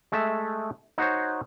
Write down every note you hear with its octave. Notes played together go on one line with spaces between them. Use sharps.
G#3 A3 E5
D#4 F#4 C5 C#5